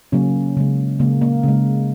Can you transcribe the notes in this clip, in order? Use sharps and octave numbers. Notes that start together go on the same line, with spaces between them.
C#3 F#3 A#3 C#4
C#3 G#3
C#3 G#3 A#3
A#3
C#3 G#3